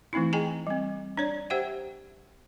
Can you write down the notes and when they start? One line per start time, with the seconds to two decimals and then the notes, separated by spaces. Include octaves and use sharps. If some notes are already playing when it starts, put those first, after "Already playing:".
0.13 E3 A3 C4 D#4 E4
0.33 G#4 D#5 G5 G#5 A#5
0.67 G3 C4
1.17 D4 C#5 D5
1.50 G4 C5 E5 F#5 G5